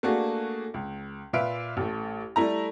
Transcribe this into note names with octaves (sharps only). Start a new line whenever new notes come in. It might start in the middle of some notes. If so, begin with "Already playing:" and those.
A3 A#3 D4 F#4 G#4
C#2
A#2 B4 E5 F5 D7
A1 A3
G3 A3 E4 A#5